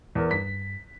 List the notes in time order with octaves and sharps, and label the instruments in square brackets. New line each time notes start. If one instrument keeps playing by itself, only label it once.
[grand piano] E2 A#4
[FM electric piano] G2 [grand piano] B6